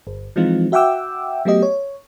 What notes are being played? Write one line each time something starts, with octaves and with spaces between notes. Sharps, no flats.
G1
E3 F3 G#3 C4 D#4 F4
F#4 E5 F#5 G5 D6 E6
F#3 A3 B3 G4 D#5
C#5